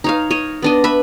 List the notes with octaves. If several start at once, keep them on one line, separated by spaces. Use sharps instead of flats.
D#4 C#5 F5
C#5 D#5
B3 D4 D#5
B4 E5 B5